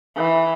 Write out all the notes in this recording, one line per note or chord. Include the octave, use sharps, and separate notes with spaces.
E3